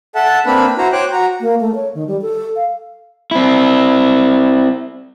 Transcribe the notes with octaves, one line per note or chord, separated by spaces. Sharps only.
A4 E5 F#5 A5
A#3 C4 D4 B4 B5
E4 F#4 C5 A#5
C5 C#5 G5 D6 F#6
F#4 A#5
A#3
A3
C#5
D#3
G3
A4
F5
C4 E4